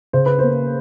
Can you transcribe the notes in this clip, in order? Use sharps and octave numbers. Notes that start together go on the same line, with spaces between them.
C#3 C5
B4
A#3 C5